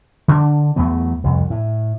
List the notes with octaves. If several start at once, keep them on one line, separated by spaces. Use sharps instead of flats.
D3 D4
E2 F#3 A3 B3
C2 F2
A2